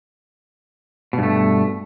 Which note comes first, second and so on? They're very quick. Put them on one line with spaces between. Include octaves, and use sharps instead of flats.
B2 G2 A3